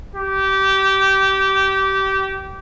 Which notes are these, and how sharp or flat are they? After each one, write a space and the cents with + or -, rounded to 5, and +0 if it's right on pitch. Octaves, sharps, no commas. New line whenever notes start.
G4 -20